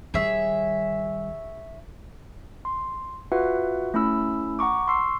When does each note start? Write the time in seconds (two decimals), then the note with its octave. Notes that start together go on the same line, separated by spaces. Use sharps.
0.14 D#3 G3 G#4 C#5 E5
2.65 C6
3.32 F4 F#4 B4 E5 F#5
3.94 A3 C#4 E4 B5 E6
4.59 F#5 A#5 C#6 D6
4.88 C6 C#6 E6 C7